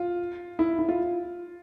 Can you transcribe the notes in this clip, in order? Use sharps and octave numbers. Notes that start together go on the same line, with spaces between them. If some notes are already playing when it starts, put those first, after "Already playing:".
Already playing: F4
E4
E4
F4